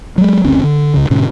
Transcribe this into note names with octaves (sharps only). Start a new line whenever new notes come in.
F#3 G#3
F#1 D2 C4 C#4
D3
C#2 C#3
G#2 B2 D3 C#4